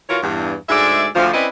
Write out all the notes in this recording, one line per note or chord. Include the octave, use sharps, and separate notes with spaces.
E3 F4 F#4 A#4 C#5
E2 G2
D2 G#2 G#3 D5 E5
D2 F3
C4 C#4 E4 B4 D5 D#5